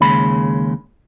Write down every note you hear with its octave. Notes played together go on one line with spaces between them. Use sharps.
D#2 C#3 G#3 B5